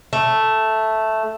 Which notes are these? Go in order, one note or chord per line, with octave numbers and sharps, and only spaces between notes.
A3